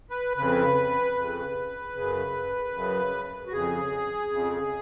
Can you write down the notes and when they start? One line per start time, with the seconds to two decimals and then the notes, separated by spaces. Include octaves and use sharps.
0.10 B4
0.37 F2 C#3 B4
1.16 F2 C#3
1.95 F#2 C#3
2.73 F#2 C#3
3.47 F#4
3.53 F2 C#3 G#4
4.32 F2 C#3